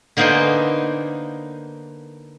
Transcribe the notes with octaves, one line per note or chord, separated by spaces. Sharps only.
D3 A#3 B3 D#4 C5 G#5